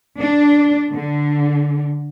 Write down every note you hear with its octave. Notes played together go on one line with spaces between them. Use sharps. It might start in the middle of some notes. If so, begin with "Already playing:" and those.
D4
D3